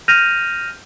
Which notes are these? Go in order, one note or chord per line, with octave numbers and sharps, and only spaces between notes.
F6 G6 A#6 D#7 F7